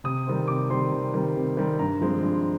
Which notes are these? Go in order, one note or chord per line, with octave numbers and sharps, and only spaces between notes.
C3 D#6
D#3 G3 C4
C3 D6
D#3 G3 C4 C6
C3
D#3 G3 C4
C3
D#3 G3 C4
G2 A#5
F3 G#3 C4
G2